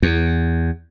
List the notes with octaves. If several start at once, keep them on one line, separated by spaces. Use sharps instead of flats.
E2